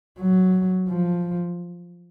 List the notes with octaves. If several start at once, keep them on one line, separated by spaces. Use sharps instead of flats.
F#3
F3